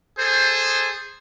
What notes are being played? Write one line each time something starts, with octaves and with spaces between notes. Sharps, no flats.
G#4 A4 C5